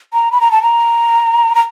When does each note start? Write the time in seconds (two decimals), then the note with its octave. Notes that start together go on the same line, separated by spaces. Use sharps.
0.13 A#5
0.32 B5
0.41 A#5
0.52 A5
0.63 A#5
1.55 A#5